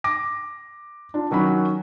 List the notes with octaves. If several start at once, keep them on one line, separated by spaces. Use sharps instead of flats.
D6 A#6
D4 F4
D#3 F#3 C#4 F#4 B5